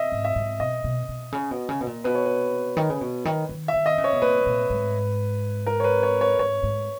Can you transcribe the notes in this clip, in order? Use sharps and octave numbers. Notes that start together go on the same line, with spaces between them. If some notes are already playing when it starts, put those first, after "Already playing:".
Already playing: D#5 E5
G#2
E5
G#2
B2 D#5
B2
B2
C#3
B2
C#3
B2
A#2
B2 B4
C#5
B4
D#3
C#3
B2
D#3
D#3
E5
D#3
D#5
C#3
C#5
B2
A#2 B4
A#2
G#2
A#4
C#5
B4
C#5
C#5
G#2 C#5
G#2